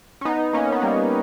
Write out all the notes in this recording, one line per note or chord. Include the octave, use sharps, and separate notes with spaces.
C#4
B3 D#4
A#3 C#4
B3
G3 A#3